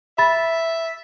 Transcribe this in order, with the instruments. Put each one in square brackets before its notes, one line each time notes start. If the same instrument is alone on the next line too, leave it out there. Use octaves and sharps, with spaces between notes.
[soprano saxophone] E5 [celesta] B5 A6